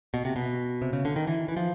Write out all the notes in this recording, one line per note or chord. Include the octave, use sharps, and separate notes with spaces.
B2
C3
B2
C3
C#3
D3
D#3
E3
E3
F3